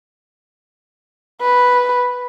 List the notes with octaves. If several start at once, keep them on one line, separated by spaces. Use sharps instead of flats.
B4